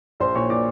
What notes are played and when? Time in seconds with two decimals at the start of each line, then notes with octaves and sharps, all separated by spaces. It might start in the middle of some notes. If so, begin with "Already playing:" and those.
0.20 A#1 C5 C6
0.35 A#2 C#5 C#6
0.50 A#2 D5 D6